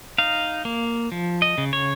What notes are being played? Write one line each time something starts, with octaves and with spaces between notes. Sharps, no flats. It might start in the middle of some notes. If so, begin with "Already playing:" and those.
D#4 F5
A#3
F3
D#5
C#3
C#5